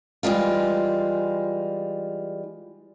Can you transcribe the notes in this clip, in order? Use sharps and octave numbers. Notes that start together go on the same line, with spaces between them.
E3 G3 G#3 F4